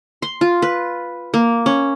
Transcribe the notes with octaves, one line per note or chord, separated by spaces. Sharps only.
C6
F4
B4
A#3
C#4